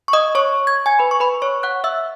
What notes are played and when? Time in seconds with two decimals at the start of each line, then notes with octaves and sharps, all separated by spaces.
0.08 C#6
0.13 D#5 D#6
0.35 C#5 C#6
0.67 G#6
0.86 G#5 G#6
0.99 B4 B5
1.11 C#6
1.20 B4 B5
1.42 C#5 C#6
1.63 F#5 F#6
1.84 E5 E6